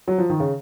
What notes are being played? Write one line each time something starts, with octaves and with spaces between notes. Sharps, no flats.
F#3
F3
D#3
C#3